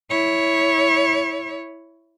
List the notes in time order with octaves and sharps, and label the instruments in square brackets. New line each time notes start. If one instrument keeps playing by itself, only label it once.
[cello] E4 C#5